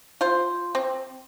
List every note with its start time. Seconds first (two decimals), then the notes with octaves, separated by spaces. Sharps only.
0.21 F4 C5
0.75 C4